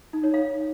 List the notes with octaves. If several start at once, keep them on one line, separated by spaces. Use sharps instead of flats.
D#4
C#5
F5